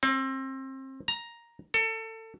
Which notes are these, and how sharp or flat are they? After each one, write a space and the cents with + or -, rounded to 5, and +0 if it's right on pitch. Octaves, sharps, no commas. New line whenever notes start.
C4 +30
A#5 +5
A4 +25